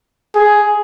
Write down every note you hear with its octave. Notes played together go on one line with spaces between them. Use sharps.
G#4